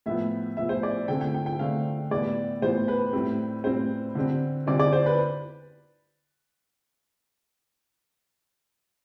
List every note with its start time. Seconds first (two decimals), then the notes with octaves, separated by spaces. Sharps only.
0.06 A2 F3 B3 E5
0.57 A2 F3 B3 E5
0.69 C5
0.83 D5
1.08 D3 A3 C4 G5
1.21 G5
1.34 G5
1.46 G5
1.59 D3 A3 C4 F5
2.11 A2 E3 G3 B3 D5
2.61 A2 E3 G3 B3 C5
2.88 B4
3.13 A2 G3 C4
3.64 A2 G3 C4 C5
4.15 D3 G3 C4
4.67 D3 G3 C4 D5
4.79 D5
4.93 C5
5.06 B4